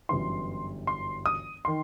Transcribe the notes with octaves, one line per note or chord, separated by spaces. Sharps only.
G1 F#2 E3 C6
C6
D#6
D#3 C6